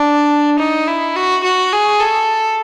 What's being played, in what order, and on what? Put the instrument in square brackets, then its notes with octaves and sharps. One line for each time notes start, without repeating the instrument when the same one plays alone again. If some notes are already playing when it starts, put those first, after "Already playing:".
Already playing: [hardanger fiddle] D4
D#4
E4
F#4
F#4
G#4
A4